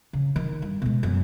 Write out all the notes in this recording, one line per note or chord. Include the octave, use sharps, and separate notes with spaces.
C#3
D#3
G2
B2 G#3
F#2